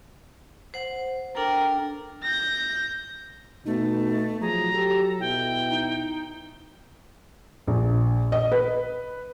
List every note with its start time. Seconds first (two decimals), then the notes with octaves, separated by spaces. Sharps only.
0.74 C5 F#5
1.36 D4 A4 A#4 G5
2.23 G6 A#6
3.66 B2 A3 D#4
4.41 F3 F#3 G#4 A#5
4.73 G4 A4
5.20 B2 E4 G5
5.69 D#4
7.67 A#1
8.32 D#5
8.52 B4